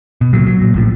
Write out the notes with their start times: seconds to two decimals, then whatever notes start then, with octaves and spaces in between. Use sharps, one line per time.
0.21 B2
0.33 C#2 A#2 F#3
0.47 F#3
0.61 A#2
0.74 A#1 A2 F3